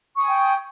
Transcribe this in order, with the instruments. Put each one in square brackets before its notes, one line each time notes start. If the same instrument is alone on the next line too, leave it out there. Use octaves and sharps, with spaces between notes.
[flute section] C#6
D#6
G#5
G5